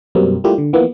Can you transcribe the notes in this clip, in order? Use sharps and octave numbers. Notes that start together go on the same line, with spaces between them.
F#2 B2 G3 A#3 C4
G3 A3 A#3 E4 F4 G4
D3
E3 F3 A#3 B3